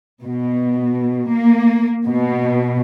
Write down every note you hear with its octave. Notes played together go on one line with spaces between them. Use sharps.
B2
A#3
B2